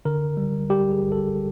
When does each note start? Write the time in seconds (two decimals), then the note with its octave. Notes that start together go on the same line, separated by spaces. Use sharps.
0.05 D3 A#4
0.37 G3
0.70 G3 G4
0.91 G#4
1.02 G1
1.12 A4